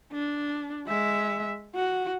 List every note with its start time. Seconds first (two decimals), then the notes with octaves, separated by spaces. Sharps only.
0.12 D4
0.87 G#3 E5
1.75 F#4